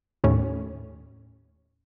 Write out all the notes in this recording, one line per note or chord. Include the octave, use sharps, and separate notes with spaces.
D#2 A2 C#4